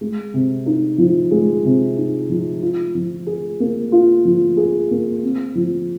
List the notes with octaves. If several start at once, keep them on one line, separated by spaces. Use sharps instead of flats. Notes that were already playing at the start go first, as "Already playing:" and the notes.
G#3
C3
D#4
F3
G#3
C3
D#4
F3
F4
F3
G#4
A#3
F4
F3
G#4
A#3
C4
F3